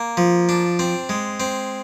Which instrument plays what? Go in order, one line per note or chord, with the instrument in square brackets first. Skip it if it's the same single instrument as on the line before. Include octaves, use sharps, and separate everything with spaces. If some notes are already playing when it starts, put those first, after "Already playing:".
Already playing: [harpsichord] A#3
F3
D4
C4
G#3
C4